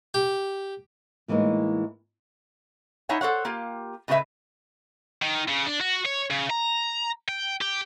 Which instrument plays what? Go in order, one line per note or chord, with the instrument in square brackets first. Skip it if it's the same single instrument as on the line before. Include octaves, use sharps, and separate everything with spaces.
[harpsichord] G4
[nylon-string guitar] A2 E3 G#3 A#3 D#4
[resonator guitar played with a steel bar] D#4 E4 C#5 F#5 G#5
A4 C5 C#5 F#5
A#3 F4 G4
A2 C#3 G#3 F4 B4 E5
[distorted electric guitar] D#3
C#3
D4
F#4
C#5
C#3
A#5
G5
G4